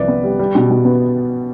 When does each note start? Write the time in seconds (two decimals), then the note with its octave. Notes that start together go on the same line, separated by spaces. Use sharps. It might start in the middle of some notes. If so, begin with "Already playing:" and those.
Already playing: C2 C3 F3 B4 D5
0.08 B3
0.24 G3
0.39 G3
0.55 B2
0.70 B2
0.85 B3